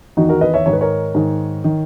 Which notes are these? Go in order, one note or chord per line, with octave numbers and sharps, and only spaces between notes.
E2 D#3 D#4 F#4
F#4 A#4
B4 D#5
C#5 E5
G#2 D#3 C#5
B4
A#4 C#5
G#2 D#3
D#3